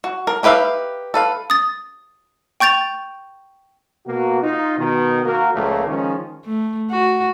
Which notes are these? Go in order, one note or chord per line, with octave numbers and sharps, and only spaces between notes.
F#4
A#4
D#4 G4 B4 E5 F5
A4 B4 F5
D#6 A6
G5 C#6 G6 A6 F7
B2 A#3 F#4
D#4 F4
B2 D#3
A#3 F#4 A#4
C#2 A#2 C#3 F3 A3 A#3
D#3 F3 G#3 C#4
A3
F#4